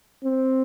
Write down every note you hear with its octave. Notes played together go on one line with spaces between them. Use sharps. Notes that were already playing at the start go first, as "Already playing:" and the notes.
C4